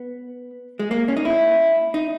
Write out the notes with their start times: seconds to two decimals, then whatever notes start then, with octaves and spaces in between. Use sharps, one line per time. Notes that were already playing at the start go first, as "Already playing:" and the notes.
Already playing: B3
0.79 G#3
0.91 A#3
1.08 C#4
1.17 D#4
1.25 E4
1.94 D#4